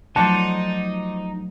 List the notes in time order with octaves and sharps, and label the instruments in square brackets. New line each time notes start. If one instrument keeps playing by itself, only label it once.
[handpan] F3 F#3 A3 [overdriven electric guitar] D#4 [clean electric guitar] C5 D5 F#5 [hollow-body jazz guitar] A5